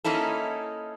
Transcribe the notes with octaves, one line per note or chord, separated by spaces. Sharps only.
A#3 C#4 D#4 E4 A4